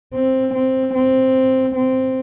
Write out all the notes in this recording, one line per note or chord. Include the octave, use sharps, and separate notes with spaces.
C4
C4
C4
C4